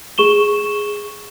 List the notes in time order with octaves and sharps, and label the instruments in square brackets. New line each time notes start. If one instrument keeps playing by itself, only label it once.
[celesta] G#4 C#6 E7 G7